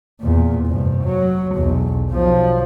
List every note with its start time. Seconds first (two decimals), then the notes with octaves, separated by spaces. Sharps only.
0.21 E2 A#2
0.66 F1 G2
1.03 F#3
1.55 B1 E2
2.11 B1 F3